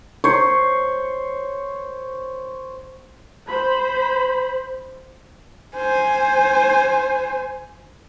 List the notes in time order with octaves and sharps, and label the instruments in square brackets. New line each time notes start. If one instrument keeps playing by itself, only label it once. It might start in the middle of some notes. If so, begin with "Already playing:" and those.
[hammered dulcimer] C5 C#5
[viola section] C5 B5
[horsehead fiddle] C5 G#5